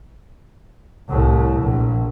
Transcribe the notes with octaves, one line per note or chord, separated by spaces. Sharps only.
C2 A2
A#1